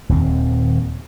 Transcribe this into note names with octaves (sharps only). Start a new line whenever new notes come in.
D#1 D#2 C4